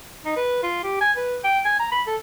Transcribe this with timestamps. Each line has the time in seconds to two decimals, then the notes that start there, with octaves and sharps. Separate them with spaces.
0.25 D#4
0.37 B4
0.63 F4
0.84 G4
1.01 G#5
1.17 B4
1.44 G5
1.65 G#5
1.79 A#5
1.92 B5
2.07 A4